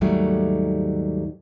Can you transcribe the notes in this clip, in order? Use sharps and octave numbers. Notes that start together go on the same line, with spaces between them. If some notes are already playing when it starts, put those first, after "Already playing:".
D#2 G#2 D#3 F#3 G3 A3